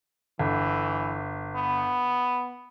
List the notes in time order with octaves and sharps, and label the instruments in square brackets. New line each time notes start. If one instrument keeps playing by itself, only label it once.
[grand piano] G1 [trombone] E3
[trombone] B3